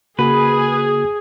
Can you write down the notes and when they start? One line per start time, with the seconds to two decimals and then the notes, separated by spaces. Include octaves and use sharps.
0.19 C#3 A#3 F#4 G#4 B4